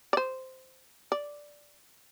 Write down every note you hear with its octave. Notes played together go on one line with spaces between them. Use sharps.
D5
C5
D5